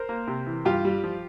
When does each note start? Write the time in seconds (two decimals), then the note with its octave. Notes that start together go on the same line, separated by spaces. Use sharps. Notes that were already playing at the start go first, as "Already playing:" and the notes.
Already playing: A#4 C5
0.09 A#3
0.27 C3
0.46 E3
0.65 G2 F4 G4
0.85 G3
1.04 F3